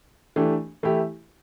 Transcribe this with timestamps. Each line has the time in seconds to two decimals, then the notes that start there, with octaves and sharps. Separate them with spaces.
0.36 E3 A3 D4 G4
0.83 E3 A3 E4 G4